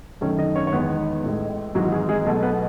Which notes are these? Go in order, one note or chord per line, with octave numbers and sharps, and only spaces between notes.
F#2 D#3 A3 C#4 C#5
D#4 D#5
C#4 C#5
C#5
E2 D#3 G#3 B3 B4
A1 A2 G#3
G#1 G#2 E3 F#3 G#3 F#4
F#4
G#3 G#4
G#3 G#4
B1 B2 A3 A4
B3 B4